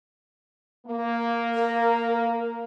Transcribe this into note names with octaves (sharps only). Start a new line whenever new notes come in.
A#3
A#4